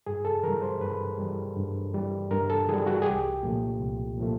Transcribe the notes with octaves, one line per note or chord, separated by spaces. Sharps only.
G2 G#4
A4
E3 G3 A#4
C5
G2 B4
E3 G3
G2
E3 G3
G2 A#4
A4
E3 G3 G#4
F#4
G#4
C2 G4
A#2 F3 A3
C2
A#2 F3 A3